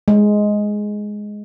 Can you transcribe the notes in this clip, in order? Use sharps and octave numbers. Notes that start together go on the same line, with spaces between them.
G#3